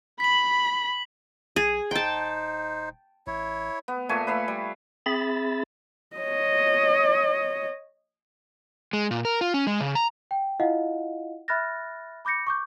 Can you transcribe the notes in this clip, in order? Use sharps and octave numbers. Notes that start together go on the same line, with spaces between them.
B5 B6 F#7
B1 G#4
D#1 D#4 C5 G5 A5
A1 E4 C#5
B3
A#2 A3 G#5 C#6
B4 E5 F5 B5
G3
C4 G#4 E5 B5 A6
C#5 D#5
G#3
A#2
A#4
F4
C#4
G#3
C#3
A#5
G5
E4 F4 D#5 F5 F#5
E5 B5 F6 F#6 A6 A#6
B5 D6 G6 A#6 C#7
C#6 D6 G6